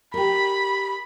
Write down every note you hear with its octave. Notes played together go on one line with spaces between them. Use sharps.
G4 A#4 B5